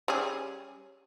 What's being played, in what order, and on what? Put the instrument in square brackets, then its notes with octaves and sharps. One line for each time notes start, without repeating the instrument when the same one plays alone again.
[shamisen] G3 C#4 G#4